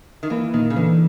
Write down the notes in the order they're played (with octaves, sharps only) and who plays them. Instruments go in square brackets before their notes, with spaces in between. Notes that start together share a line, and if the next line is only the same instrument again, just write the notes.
[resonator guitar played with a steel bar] D#3
[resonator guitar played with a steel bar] E3 [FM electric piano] A#3
[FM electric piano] A#2 [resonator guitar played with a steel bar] D#3
[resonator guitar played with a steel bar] C#3
[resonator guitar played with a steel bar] D3 [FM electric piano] E3